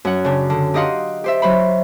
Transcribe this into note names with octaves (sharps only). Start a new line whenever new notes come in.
F#2 F#5
C#3 D4
D3
D#4 G4 D#5 F5 F#5 C6
G4 C5 E5
F#3 C5 B5